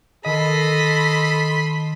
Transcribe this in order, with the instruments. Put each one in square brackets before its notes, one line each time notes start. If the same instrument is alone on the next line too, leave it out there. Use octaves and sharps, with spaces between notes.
[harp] D#3 [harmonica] A4 [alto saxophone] D#5 [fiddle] B5 C6